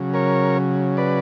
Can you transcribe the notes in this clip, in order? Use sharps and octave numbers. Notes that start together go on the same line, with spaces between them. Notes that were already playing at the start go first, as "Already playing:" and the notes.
Already playing: C#3 F#3
A#4 C#5
B4 D5